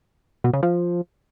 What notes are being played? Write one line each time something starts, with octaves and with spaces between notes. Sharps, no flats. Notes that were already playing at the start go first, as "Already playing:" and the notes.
B2
C#3
F3